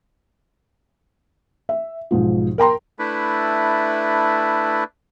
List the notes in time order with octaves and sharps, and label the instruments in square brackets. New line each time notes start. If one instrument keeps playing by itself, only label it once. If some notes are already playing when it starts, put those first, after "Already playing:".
[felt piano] E5
B1 G#2 F3
A#4 G5 A#5 C6
[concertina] A3 D4 E4 B4